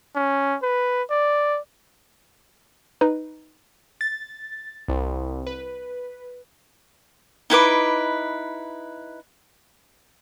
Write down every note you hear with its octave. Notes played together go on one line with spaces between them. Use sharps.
C#4
B4
D5
D#4 B4
A6
C2
B4
D#4 E4 B4 D6